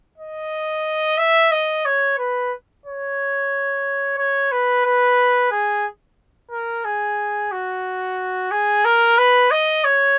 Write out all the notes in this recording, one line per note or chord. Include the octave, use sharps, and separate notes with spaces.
D#5
E5
D#5
C#5
B4
C#5
C#5
B4
B4
G#4
A#4
G#4
F#4
G#4
A#4
B4
D#5
C#5